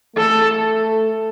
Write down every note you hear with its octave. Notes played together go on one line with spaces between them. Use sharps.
A3 A4